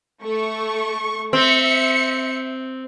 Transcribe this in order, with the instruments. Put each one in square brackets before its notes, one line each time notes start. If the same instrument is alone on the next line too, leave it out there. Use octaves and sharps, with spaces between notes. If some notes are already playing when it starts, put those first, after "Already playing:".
[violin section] A3 C#6
[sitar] C4 [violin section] E5 C#7